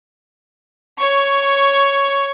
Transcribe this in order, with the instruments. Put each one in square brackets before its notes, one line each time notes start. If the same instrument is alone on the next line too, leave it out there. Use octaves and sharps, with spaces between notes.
[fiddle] C#5 C#6